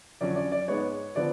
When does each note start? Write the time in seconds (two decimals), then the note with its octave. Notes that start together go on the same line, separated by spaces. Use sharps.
0.21 F2 D3 F#3 C#4 D5
0.36 D5
0.52 D5
0.68 G#2 G#3 B3 C#5
1.16 D3 F3 B3 D5